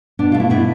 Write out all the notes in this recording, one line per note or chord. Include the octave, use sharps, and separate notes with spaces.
B2 D4
F4
A3
E4
B2 E4